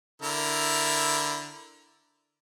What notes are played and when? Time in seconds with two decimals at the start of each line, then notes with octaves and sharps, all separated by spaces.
0.22 D3 E4 A#4